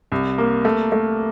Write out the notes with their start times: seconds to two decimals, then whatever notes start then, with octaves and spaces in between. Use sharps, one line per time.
0.12 C2
0.38 A#3
0.65 A3
0.92 A3